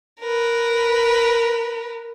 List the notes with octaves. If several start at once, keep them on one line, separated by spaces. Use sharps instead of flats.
A#4 B4